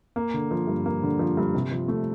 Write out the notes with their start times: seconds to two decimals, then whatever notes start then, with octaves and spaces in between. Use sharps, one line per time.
0.16 A#3
0.34 D3
0.51 F3
0.67 G2
0.86 A#3
1.03 D3
1.19 F3
1.37 G2
1.55 C3
1.71 F3
1.88 A3